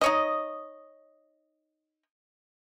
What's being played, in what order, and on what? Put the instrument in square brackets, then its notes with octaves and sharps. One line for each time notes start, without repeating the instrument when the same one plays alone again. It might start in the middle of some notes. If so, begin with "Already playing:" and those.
[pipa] D#4 C#5 D#5